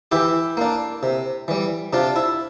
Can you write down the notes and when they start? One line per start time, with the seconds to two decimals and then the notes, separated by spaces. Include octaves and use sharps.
0.12 E3 E4 G4
0.57 A#3 D4
1.03 C3
1.48 E3 G3
1.93 C3 D4 F4
2.16 E4